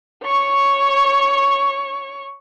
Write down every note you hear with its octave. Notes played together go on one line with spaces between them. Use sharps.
C#5 C#6